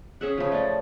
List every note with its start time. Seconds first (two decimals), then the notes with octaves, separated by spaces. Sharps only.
0.21 C#4 G#4 E5 F#5
0.37 C#3 F3
0.52 A3 C#4 D5